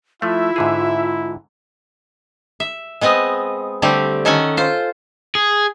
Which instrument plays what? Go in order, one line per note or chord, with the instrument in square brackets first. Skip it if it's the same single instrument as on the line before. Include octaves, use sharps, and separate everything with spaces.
[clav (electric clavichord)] F3 A3 [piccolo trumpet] E4 [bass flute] F4 [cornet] E5
[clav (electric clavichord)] G#2 D3 G#4
[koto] E5
G#3 B3 C4 D#5
D3 G3 A3 C4 G4
D#3 C#4 A4 F#5 G#5
F4 C5
[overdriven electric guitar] G#4